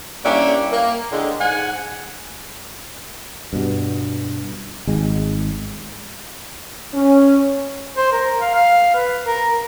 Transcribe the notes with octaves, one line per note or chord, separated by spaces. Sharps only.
G3 A#3 C#4 D4 E4 G4
A#3
A2 D3 G#3
G#2 F#5 G#5
G2 B2
G#1 G#3
C#4
C5
A#4
F5
F5
B4
A#4